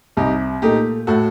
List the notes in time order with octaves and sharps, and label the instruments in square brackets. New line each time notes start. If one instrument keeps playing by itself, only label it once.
[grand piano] C2 [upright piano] D#4 G4
[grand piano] A#2 A3 [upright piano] D#4 G4
[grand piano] A2 [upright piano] F#4 A4